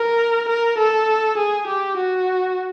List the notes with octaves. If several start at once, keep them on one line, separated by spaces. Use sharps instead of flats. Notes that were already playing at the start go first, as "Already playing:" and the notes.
Already playing: A#4
A#4
A4
G#4
G4
F#4